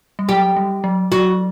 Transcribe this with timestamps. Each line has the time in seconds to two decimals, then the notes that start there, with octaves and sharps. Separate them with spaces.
0.19 G3
0.28 F#3 G4
0.56 G3
0.84 F#3
1.12 F#3 F#4